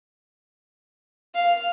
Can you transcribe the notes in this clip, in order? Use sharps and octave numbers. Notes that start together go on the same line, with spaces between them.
F5